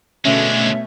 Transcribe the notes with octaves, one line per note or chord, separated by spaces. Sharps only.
B2 D3 G#3 A3 C#4 E5